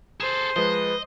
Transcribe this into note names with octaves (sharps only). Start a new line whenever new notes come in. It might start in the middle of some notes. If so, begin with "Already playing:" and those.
G#4 A4 C5 E7
F3 G#3 B4 D#5